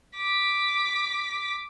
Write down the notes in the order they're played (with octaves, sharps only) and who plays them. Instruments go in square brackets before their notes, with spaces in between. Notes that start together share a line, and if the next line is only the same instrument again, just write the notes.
[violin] D6 B6